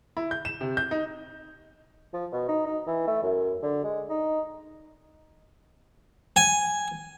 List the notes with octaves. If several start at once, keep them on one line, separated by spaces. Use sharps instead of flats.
E4
G6
E7
C3
G6
D#4
F3
B2
D#4
D#4
E3
A3
F#2
D3
G#3
D#4
G#5